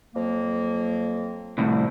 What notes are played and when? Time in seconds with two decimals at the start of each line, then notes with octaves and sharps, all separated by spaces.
0.15 F2 F#3 A#3
1.58 C2 A2